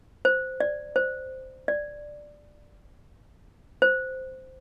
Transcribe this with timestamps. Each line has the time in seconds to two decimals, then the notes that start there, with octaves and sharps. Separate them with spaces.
0.25 C5
0.60 D5
0.96 C5
1.68 D5
3.82 C5